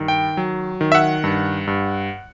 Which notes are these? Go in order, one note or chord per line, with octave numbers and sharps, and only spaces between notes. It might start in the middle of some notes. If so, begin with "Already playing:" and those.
Already playing: G2 D#3
G5
F#3
D#3
E5
F#5
G2
G2